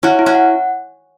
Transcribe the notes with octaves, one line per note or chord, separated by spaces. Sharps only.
C#4 E4 F#4
E4
C#4 F#4
F#5